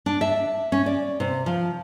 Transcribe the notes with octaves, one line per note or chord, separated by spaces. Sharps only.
D4
E5
C#4
D5
C3
F3